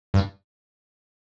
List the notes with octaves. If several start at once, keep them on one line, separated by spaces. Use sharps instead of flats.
G2